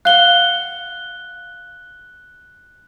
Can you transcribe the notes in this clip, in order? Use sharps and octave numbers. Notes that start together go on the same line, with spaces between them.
F5 F#5 F#6 G7